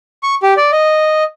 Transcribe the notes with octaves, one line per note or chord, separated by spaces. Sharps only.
C#6
G4
D5
D#5